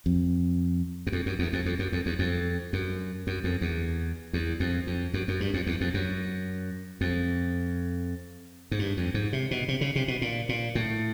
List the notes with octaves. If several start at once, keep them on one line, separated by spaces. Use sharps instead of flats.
F2
F#2
F2
F#2
E2
F2
F2
F#2
F2
E2
F2
F#2
F#2
F2
E2
E2
F2
F2
F#2
F#2
G2
F2
E2
F2
F#2
F2
G#2
G2
F2
G#2
C3
B2
C3
C#3
C3
B2
A#2
A#2
A2